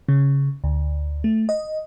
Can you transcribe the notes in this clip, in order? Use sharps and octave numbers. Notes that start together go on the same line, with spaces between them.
C#3
D2
A3
D#5